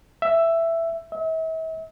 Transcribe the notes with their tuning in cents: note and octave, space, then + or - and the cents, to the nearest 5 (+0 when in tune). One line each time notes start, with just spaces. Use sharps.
E5 +10
E5 -40